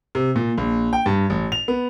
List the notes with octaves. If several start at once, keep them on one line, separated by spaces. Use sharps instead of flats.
C3
A#2
A#1
G5
G2
A1
F7
B3